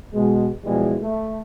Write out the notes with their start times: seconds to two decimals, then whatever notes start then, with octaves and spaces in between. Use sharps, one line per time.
0.14 B2 G#3
0.65 B2 E3 F3 G3 G#3
1.01 A3